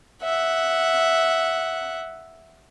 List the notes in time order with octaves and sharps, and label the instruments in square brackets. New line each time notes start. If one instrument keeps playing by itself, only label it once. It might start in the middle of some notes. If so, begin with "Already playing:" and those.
[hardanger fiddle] E5 F#5